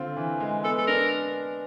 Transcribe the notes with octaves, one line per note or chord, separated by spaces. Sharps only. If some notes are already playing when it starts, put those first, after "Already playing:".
Already playing: D3 C4 F4
E3
G#3
B3 A4
A4
D4 A#4